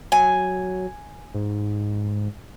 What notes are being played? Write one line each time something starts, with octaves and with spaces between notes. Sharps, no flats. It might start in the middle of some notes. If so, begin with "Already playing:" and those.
F#3 G#5
G#2